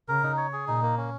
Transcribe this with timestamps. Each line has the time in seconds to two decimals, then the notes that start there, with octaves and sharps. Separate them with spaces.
0.08 C#3 A#4
0.23 D#4
0.37 C#5
0.53 G#4
0.68 A#2 D#4
0.82 A#3
0.97 C#4